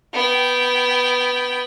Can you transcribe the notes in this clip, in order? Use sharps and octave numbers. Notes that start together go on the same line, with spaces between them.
B3 G5